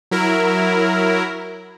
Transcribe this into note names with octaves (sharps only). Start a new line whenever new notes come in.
F#3 E4 A#4